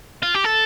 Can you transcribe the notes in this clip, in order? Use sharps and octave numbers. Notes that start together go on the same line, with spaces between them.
F4
G4
A4